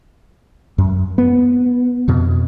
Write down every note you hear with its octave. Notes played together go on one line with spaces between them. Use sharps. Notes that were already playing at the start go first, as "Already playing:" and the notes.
F#2
B3
F2 B2